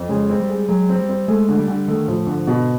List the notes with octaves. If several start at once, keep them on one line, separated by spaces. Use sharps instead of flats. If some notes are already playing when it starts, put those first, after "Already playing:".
Already playing: F2
C#3 G#3
C4
G3
G#3
F#3 G#3
C4
G3
C4
G#3 A3
D3
G3
D3
D#3 A3
A2 F3
G#2 D3
B2